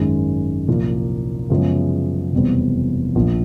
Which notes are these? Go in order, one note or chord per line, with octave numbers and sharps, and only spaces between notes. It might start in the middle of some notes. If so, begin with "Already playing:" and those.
Already playing: G#1 F#2 D#3 G#3 C#4
C2 A#2 F3 A#3
F#2 C#3 F3 G#3 B3
F1 E2 B2 G3 C4
A#1 A#2 F3